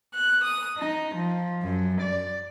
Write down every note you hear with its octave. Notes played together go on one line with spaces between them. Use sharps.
F#6
D#6
D#4
F3
F#2
D5